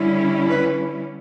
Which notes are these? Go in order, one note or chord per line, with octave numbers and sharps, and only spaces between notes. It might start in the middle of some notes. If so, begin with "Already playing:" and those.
Already playing: D3 G3 C#4 E4
B4